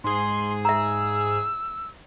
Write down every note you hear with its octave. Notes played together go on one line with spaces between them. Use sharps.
G#2 G#4 C6
E5 A#5 E6